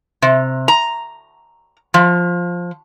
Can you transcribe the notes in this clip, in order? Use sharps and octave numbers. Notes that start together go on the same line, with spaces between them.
C3
A#5
F3